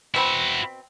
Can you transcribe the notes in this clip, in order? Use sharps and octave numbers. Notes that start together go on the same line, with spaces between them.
B2 C4 E4 F#4 B5